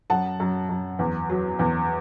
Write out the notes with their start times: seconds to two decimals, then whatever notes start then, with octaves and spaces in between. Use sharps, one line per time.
0.10 F#2 F#5 A5
0.40 F#2
0.69 F#2
0.99 E2
1.30 F#3
1.59 E2